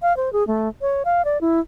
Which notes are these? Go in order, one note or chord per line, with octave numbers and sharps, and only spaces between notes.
F5
C5
G#4
A3
C#5
F5
D5
E4